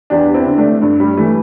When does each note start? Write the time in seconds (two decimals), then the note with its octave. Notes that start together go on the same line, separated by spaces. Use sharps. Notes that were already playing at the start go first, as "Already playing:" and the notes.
0.10 E2 D4 G4
0.34 C4 E4
0.46 D3
0.58 A3 D4
0.81 G2 A3
1.00 G3
1.17 E3 A3